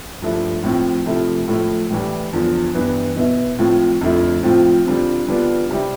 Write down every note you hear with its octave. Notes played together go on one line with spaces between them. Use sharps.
G2 F3 A3 E4
A2 F3 C4
C3 F3 A3 E4
A2 F3 A3 E4
A2 E3 G3
E2 D3 F3
G2 E3 B3
B2 B3 E4
A2 F3 C4 F4
F2 D3 F3 A3 E4
A2 F3 C4 F4
D3 G3 C4 F4
D3 G3 B3 D4 F4
C3 G3 C4 E4